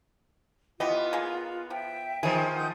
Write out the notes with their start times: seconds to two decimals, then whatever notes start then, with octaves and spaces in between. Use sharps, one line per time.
0.80 E3 B3 F4 G4 D#5
1.13 A#3 G#4
1.70 F3 E5 G5
2.23 D#3 F3 B3 G#4
2.55 F#5 D#6 G6